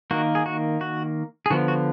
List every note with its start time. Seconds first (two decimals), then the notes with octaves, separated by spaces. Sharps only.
0.11 D#3 A#3 F#4
0.35 G#4
0.46 F#4
0.81 F#4
1.46 G#4
1.50 D3 F3 B3 F#4
1.68 F#4